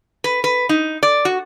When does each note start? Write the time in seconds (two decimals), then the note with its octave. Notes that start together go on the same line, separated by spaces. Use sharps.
0.24 B4
0.44 B4
0.69 D#4
1.03 D5
1.25 F#4